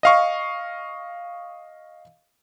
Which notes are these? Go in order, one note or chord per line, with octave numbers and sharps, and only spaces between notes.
D#5 F5 C#6